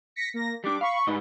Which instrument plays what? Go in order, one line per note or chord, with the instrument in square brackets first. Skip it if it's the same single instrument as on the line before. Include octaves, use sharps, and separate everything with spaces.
[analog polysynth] A#6 B6 C#7
A#3 A#6
[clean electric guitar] G3 D4 [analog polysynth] D6
[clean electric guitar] F5 [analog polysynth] B5 C#6
[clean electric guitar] G#2 G3 D#5 [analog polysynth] D#4 B4